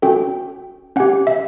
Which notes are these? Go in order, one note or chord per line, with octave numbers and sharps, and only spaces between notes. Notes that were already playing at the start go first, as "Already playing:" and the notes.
C#4 F#4 A4 G5
C#4 G4 F#5
E5